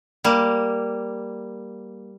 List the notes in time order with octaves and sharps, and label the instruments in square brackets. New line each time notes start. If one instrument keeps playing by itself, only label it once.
[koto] G3 A#3